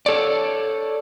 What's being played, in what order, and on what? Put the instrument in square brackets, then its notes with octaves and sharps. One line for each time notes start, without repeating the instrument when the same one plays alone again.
[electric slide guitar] A4 C#5 D5